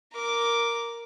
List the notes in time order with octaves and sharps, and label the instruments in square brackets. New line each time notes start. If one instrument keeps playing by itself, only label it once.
[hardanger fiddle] A#4 D6